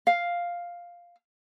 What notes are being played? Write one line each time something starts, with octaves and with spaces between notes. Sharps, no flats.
F5